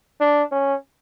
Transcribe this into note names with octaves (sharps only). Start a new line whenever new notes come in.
D4
C#4